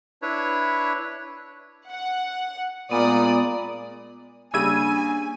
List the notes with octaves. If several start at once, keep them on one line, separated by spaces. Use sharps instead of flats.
D4 E4 B4 C#5
F#5
A#2 G#3 B3 D5 D#6
C#3 G3 A#3 D4 G#5 E6 G#6 D#7